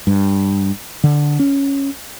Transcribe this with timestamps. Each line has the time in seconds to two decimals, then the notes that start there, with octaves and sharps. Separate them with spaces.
0.07 G2
1.04 D3
1.39 C#4